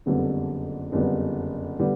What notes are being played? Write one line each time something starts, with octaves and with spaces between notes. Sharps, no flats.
F#1 F2 D3 G3 B3
F#1 F2 D3 G3 B3
D3 G3 B3